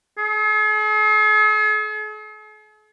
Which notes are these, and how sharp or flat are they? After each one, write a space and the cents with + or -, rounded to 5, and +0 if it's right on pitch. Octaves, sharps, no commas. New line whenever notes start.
G#4 +45